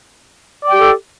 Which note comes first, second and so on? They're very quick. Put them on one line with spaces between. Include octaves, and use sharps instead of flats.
D5 G5 G4 A4